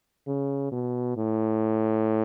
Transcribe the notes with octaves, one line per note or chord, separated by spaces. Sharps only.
C#3
B2
A2